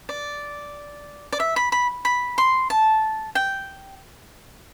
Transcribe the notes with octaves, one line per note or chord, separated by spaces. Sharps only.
D5
D5
E5
B5
B5
B5
C6
A5
G5